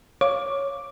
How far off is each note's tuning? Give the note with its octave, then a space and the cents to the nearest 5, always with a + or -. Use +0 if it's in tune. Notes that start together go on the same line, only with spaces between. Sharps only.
C#5 +0 F5 +0 D6 +0